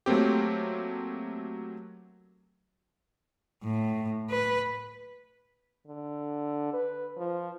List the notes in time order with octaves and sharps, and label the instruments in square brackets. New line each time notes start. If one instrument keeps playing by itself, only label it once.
[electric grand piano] F#3 A3 A#3 C4 G4
[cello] A2
B4
[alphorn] D3
B4
F3